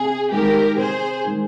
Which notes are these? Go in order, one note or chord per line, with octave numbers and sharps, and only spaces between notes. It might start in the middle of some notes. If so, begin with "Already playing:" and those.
Already playing: C3 G#4
D#3 G#3 G4 A#4
C3 G#4 C5
D#3 G#3